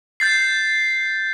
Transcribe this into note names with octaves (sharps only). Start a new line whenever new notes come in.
G6 A6 C7